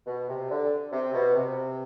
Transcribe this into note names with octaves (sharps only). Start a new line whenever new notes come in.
B2
C3
D3
C3
B2
C3